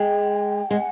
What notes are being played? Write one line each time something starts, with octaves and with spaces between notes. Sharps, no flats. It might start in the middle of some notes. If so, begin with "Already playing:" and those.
Already playing: G#3 G5
G#3 F#5